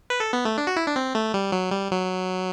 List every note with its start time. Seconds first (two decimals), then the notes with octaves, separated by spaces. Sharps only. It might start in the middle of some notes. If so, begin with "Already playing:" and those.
0.10 B4
0.20 A4
0.33 B3
0.45 A3
0.58 D4
0.67 F#4
0.76 E4
0.87 D4
0.96 C4
1.15 A3
1.34 G3
1.52 F#3
1.71 G3
1.91 F#3